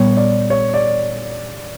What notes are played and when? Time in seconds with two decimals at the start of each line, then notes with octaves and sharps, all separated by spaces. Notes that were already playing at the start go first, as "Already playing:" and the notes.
Already playing: A#2 G3 B3 C#5
0.17 D5
0.50 C#5
0.74 D5